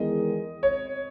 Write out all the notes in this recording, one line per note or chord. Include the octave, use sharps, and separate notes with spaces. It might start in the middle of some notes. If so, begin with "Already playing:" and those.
Already playing: E2 D#3 G#3 D#5
C#5